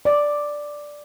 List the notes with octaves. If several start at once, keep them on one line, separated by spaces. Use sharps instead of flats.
D5